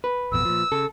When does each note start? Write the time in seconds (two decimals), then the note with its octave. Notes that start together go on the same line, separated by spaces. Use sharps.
0.04 B4
0.32 A1 F2 B2 E6
0.45 A#2 F3
0.72 C#3 A4